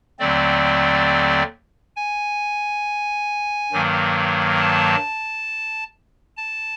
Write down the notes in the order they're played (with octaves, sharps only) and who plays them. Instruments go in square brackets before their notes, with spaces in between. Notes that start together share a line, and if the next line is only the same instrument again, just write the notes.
[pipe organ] D#2 D3 F#3 A3 C4 D5
G#5
G2 D#3 F#3 A#3
A5
A5